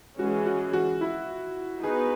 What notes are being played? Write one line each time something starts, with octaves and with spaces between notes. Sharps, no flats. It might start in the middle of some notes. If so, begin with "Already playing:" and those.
E3 G#3 C#4 F#4 G#4
F#4
F#4
E4
B3 D#4 F#4 G#4 B4